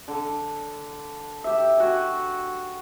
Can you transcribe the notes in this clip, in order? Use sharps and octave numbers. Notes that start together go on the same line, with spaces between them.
D3
G4 E5
F#4 G#5